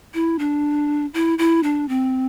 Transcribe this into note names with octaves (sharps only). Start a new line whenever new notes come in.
E4
D4
E4
E4
D4
C4